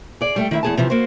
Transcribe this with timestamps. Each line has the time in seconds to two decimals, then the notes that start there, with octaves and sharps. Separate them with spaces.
0.21 G#4 D5
0.36 G3 A3 G5
0.51 D#3 E4 E5
0.63 E2 G#4 A5
0.77 C3 E3 F3
0.90 A#3 F#4 C5